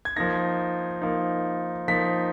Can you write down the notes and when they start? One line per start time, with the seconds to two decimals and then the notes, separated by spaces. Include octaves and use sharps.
0.05 G#6
0.16 F3 A#3 D#4 A#6
1.02 F3 A#3 D#4
1.88 F3 A#3 D#4 B6